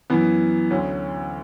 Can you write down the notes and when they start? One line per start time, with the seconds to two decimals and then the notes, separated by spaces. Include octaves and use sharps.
0.10 F#2 E3 B3
0.70 D2 D3 F#3 C#4